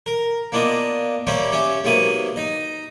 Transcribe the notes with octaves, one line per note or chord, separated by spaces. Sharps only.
A#4
A#3 B3 D4 F4 D#5
G3 A#3 C#4 G4 C5 E5
C#4 G4 E5
G#2 C3 F#3 A#3 B3 D#6
D#4 D#5